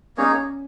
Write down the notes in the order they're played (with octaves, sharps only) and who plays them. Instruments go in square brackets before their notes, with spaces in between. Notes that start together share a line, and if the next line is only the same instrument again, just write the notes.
[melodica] A#3 D#4 G#4 C#5 [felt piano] C#4